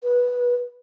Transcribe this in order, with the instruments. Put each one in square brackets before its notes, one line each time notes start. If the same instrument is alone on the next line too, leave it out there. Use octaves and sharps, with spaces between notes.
[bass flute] B4